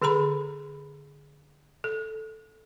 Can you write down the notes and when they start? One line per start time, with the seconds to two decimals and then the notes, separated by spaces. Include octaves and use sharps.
0.02 D3 G#4 A4 A#5 B5
1.84 A4